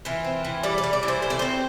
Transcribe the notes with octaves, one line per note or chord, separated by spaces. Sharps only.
E3 F4
C4
E3
G3 D5
D5
G3
D5
E3
C5
A2 C5
D5
C4 C5